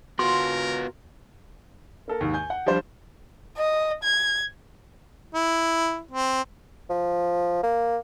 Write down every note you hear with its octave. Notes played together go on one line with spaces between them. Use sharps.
B3 F4 F#4 A#4 C6
A#3 A4 A#4
D#2 G#2
G#5 G6
F#5
F3 G3 D4 C5
D#5
G#6
E4
C4
F3
A#3